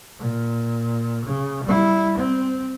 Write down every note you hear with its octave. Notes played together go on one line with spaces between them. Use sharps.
A#2
C#3
G3 E4
C4